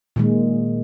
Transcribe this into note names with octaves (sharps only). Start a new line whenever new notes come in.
A#2 D#3 G#3